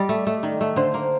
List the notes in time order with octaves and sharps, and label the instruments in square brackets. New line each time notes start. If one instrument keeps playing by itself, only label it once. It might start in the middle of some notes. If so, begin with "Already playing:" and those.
Already playing: [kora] G3 [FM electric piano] D5 D#5
[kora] A3
A3
D#3
A3
[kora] D3 [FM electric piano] C5
[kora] A#3